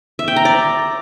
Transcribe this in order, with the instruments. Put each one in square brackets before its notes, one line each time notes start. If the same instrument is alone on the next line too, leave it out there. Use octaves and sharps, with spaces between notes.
[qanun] E5
G5
A#5
D5